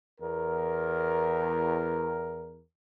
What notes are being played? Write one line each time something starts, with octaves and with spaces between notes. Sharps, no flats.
E2 A#4